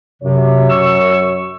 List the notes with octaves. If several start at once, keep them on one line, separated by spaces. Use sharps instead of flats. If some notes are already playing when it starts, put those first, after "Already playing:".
F#2 C3 C#5
C#6 E6